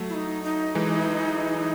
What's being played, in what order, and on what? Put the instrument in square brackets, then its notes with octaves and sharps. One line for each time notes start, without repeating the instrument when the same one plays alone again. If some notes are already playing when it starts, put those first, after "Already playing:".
Already playing: [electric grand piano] F#3 A3
[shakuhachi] E4
D#4
D#4
[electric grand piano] E3 G#3